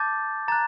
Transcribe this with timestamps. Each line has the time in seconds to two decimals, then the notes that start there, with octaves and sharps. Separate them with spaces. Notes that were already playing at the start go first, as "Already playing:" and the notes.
Already playing: A5 D6 G6 A6
0.48 A#5 F#6 A6